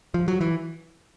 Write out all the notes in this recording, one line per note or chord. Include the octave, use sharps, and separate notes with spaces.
F3
F#3
E3